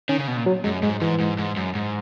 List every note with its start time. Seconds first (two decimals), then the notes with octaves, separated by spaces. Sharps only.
0.09 D#3 C#4
0.18 C#3
0.28 B2
0.37 A#2
0.46 F#3
0.64 F#2 G#3
0.83 G#2 G#3
1.01 G#2 E3
1.20 G#2
1.38 G#2
1.57 F#2
1.75 G#2